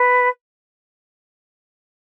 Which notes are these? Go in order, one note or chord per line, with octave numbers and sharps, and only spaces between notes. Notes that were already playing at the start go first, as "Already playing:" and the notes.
Already playing: B4